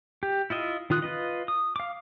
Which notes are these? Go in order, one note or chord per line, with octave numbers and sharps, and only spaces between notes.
G4
E4 F4 D#5 E5
D#3 F4 D#6 F#6
F4 B4 D#5
D#6
F5 D6